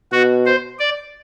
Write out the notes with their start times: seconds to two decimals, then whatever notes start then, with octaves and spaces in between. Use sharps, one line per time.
0.12 B2 F#4
0.46 C5
0.79 D5